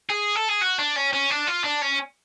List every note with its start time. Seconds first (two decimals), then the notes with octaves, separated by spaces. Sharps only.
0.09 G#4
0.35 A4
0.49 G#4
0.61 F#4
0.79 D4
0.96 C#4
1.13 C#4
1.30 D4
1.47 F4
1.64 D4
1.82 C#4